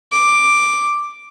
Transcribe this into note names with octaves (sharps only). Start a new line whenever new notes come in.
D6